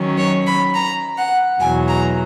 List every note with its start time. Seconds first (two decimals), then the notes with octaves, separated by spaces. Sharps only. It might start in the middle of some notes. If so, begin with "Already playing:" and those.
Already playing: D#3 F#3 C#4
0.18 C#5
0.46 B5
0.75 A#5
1.18 F#5
1.61 E2 B2 F#3 G#5
1.89 A#5